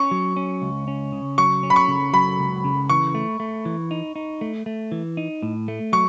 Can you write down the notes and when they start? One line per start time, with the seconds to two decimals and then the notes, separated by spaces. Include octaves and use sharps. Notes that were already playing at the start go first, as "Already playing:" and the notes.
Already playing: C#4 C#6
0.11 F#3
0.36 C#4
0.62 C#2
0.88 C#4
1.12 C#3
1.38 F#3 C#6
1.63 C#4
1.70 B5
1.76 C#6
1.88 C#3
2.13 F#3 B5
2.39 C#2
2.64 C#3
2.90 E3 C#6
3.15 A3
3.40 A3
3.65 E3
3.91 D#4
4.16 D#4
4.41 A3
4.66 A3
4.92 E3
5.17 D#4
5.42 A2
5.68 A3
5.93 F#3 C#6